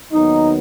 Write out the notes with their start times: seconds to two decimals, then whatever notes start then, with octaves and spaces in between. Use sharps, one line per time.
0.11 D#2 D#3 F#3 B3 D#4